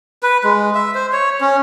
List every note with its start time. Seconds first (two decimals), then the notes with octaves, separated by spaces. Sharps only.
0.23 B4
0.44 G#3
0.75 E5
0.95 C5
1.13 C#5
1.41 C#4